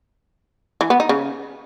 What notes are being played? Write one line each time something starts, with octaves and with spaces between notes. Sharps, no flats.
E3
B3
D#4
C#3